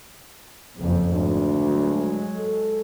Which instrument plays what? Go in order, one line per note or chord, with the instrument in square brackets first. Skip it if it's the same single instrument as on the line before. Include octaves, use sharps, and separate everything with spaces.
[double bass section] F#1 F2
[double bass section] G#1 [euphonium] D2
[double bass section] F#3 G#3
[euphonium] A4